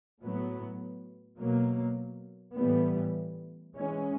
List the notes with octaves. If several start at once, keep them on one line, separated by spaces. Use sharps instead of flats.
A2 F#3 B3
B2 F#3 A#3
A2 E3 G3 B3
E3 G#3 C#4